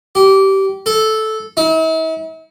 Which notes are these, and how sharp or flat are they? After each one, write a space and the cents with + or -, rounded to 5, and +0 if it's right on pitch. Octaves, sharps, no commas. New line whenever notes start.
G4 -20
A4 -10
E4 -45